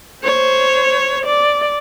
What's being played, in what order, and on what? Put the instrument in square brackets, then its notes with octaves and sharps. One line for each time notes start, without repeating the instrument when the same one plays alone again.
[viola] C5 C#5
D5